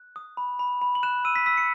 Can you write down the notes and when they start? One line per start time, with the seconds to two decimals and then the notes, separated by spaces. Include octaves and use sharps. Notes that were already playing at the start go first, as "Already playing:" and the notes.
Already playing: F#6
0.16 D#6
0.37 B5
0.59 B5
0.82 B5
0.95 F#7
1.03 F#6 E7
1.25 E6 D#7
1.36 B6
1.46 E6 B6
1.57 C#7